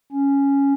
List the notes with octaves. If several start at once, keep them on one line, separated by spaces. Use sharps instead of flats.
C#4